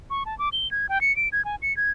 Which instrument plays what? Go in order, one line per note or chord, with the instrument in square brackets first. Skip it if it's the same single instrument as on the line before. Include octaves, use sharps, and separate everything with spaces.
[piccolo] C#6
A5
D6
G7
G#6
G5
C#7
D7
G#6
G#5
C#7
G#6